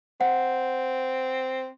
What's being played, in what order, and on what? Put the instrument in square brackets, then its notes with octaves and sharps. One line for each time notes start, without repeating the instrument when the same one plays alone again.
[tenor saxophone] C4 [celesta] F#5